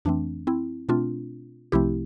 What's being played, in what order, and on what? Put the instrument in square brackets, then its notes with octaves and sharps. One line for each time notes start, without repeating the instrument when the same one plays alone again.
[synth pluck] F2 E3 A3 C4 D4
C4 E4
B2 A3 C4 D4 F4
C2 C3 F3 A3 C4 E4 G4